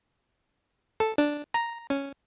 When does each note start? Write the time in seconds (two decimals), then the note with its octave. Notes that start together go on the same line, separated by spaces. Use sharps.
1.00 A4
1.18 D4
1.54 A#5
1.90 C#4